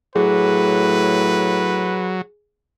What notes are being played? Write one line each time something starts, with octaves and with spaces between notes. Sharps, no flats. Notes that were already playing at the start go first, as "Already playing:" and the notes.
A2 F#3 G#4 B4